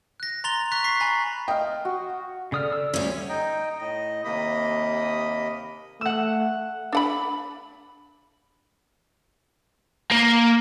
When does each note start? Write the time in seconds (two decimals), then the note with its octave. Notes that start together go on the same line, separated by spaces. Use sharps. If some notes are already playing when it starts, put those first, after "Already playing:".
0.20 F#6 A#6
0.44 A#5 C6 A6 A#6 F7 G7
0.72 C#6 F#6 A#6 B6
0.84 C#6 B6 C7
1.00 G#5 A#5 B5 A6
1.48 D#5 F5 G5
1.85 F#4
2.52 C#3 A4 D5 D#6 F6
2.73 E6
2.94 D2 G3 C#4
3.29 D#4 D#5 G5
3.79 A2 D#5
4.24 D#2 C3 A#3 D#5 B5 D#6
6.01 A3 F#5 E6
6.93 D4 F#5 B5
10.12 A#3